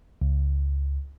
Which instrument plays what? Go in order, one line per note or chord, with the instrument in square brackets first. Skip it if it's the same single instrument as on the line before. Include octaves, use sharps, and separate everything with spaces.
[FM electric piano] C#2